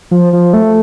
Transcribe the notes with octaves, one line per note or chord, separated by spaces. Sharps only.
F3
F3
A3